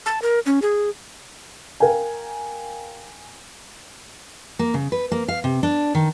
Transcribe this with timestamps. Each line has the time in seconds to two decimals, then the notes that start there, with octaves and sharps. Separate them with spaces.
0.06 A5
0.22 A#4
0.46 C#4
0.62 G#4
1.80 A#4 F5 G5 G#5
4.59 A#3
4.74 C#3
4.92 B4
5.12 A#3
5.28 F5
5.44 C3
5.63 D4
5.95 D#3